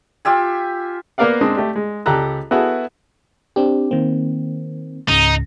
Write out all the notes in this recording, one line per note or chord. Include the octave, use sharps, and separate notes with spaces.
F4 G4 E5 G#5
A#3 B3 A#4 D5 F5 F#5
G#3 C4 D4 D#5
A3 G4
G#3
C#2 G4 A4 A#5 F#6
B3 E4 F#4 G#4 A4
C4 D4 G4
D#3 A#3 C4
C#2 G#2 C#3 D#4